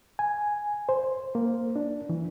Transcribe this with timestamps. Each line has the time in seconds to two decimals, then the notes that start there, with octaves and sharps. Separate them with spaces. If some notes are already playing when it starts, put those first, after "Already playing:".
0.19 G#5
0.89 C5
1.35 A#3
1.76 D4
2.10 E3